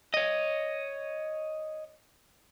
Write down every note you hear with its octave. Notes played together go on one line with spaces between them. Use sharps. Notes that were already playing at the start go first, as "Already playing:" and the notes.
C#5 D#5